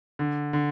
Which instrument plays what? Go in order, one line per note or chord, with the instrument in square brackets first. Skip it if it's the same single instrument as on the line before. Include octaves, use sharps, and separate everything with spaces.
[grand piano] D3
D3